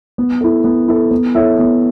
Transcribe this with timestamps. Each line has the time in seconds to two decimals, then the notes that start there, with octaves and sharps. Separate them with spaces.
0.18 B3
0.41 E4 A4
0.64 B3
0.88 E4 A4
1.11 B3
1.35 E4 A4 C#5 E5
1.59 B3